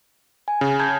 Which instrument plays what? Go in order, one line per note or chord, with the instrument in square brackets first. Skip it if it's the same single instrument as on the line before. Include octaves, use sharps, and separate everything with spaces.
[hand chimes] G#5
[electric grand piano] C#3
[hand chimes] A5 G6 G#6